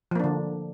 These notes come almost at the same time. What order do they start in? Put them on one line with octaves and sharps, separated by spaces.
F3 A#3 D4 D3